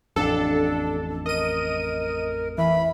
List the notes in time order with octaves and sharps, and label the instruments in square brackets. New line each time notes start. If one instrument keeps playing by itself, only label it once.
[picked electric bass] A1 F2 [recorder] D4 [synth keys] A4
[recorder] A#4 [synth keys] D#5 D#7
[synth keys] E3 [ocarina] E5 [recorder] B5